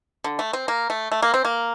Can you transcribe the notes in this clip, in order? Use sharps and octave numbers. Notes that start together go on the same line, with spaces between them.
D3
A3
C4
A#3
A3
A3
A#3
C4
A#3